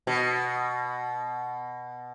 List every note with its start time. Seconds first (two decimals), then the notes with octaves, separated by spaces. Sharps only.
0.07 B2